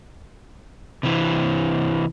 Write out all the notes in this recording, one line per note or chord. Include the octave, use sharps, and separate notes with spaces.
C3 E3 C4